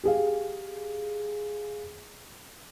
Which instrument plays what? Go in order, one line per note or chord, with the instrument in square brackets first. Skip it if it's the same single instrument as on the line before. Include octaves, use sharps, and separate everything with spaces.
[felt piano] G4 G#4 F5